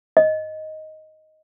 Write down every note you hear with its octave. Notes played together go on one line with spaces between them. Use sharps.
D#5